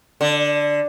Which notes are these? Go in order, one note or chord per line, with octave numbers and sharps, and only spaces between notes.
D3